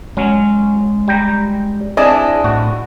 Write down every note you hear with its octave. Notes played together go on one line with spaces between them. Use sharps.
F#3 G#3 C#4
G3 G5 A#5
C4 D4 E4 G#4 D5 D#5
A2 F#4